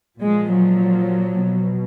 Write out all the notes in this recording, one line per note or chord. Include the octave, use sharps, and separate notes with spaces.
A#2 F3 G#3
F#3
B2